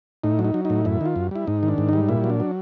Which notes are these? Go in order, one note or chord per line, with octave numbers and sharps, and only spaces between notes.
A2 D#4
F#3
D#4
F#3
D#4
A2
F#2 E4
D#3 F4
F#2
G3 E4
G#2 D#4
D#3
D4
G#2
G3 D#4
A#2 E4
F#3
D4
F#3